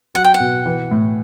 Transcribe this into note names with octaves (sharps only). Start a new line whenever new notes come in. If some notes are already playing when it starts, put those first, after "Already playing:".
F#3 F#5
G5
F#5
B2
E3
A2